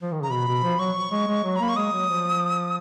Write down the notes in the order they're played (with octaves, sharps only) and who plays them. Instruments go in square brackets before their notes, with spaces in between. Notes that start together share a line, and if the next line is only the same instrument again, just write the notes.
[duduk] F3
D#3
[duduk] C#3 [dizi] A#5
[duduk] B2 [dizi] B5
[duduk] B2
F3
[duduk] F#3 [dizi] C#6
[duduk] G#3
G#3
F#3
[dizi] A#5
[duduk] A#3 [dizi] B5
[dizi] C#6
[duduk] G#3 [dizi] D#6
[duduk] F#3
F3